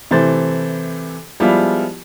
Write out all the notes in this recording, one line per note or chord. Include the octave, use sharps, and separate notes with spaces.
C3 E3 A3 C5 A6
F3 G3 G#3 B3 E4 F4